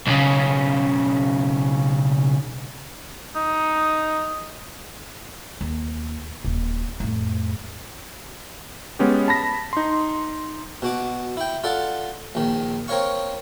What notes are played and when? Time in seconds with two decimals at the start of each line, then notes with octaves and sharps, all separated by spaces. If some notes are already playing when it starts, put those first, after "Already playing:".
0.07 B1 C#3
3.35 D#4
5.61 D#2
6.45 D#1
7.00 F2 A2
8.99 G#3 B3 C#4 G4
9.28 A5 B5 A#6 B6
9.73 D#4 C6
10.82 B2 F#4 D6
11.37 E4 G5
11.64 F4 A4 D5 F#5
12.35 A#1 D#3
12.88 C4 A#4 C#5 F5 C#6